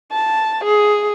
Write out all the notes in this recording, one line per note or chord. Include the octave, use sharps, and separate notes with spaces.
A5
G#4